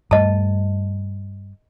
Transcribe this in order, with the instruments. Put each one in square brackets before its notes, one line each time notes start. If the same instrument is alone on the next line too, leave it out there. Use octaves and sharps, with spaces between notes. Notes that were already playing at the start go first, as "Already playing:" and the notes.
[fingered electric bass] G2 G3 A3 [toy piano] D#5 A5